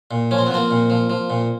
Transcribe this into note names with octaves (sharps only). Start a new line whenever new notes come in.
A#2
F3 C#4
C4
B3
F3 A#3 C4
A#2
F3
F3
A#2